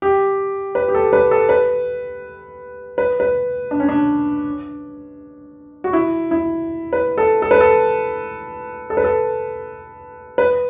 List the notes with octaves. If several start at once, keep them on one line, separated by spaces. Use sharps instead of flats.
G4
B4
G4
A4
B4
A4
B4
B4
B4
D4
C#4
D4
F#4
E4
E4
B4
A4
A4
B4
A4
A4
B4
A4
B4